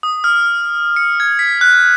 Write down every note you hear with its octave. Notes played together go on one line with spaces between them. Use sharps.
D#6
F6
C#7
G#6
B6
F#6